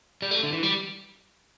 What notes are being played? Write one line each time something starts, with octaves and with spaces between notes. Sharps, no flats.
G3
A3
D3
E3
G3